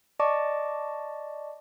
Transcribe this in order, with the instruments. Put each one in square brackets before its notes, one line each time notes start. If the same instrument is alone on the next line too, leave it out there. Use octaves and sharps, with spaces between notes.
[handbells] D5 D#5 A5 C#6 D6